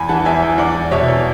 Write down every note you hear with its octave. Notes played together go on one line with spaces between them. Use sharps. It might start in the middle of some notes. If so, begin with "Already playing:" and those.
Already playing: E2 G#5 B5
E3 F#5 A5
E2 E5 G#5
E2
E2 D5 F#5
E2
B2 C#5 E5
E2